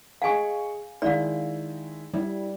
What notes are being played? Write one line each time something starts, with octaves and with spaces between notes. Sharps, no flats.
G#4 D#5 F5 G#5 C#6
D#3 G#3 E4 D5 F5
G3 E4